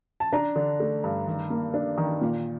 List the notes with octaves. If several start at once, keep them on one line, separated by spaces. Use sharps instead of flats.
A5
D4 A#5
D3
A3
G2
D#3
A#3
D4
D#3
A#2